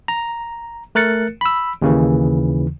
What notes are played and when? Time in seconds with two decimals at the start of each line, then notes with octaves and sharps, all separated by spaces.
0.08 A#5
0.95 A3 A#4 F#6 A6 C#7
1.41 B5 E6
1.82 D#2 C#3 E3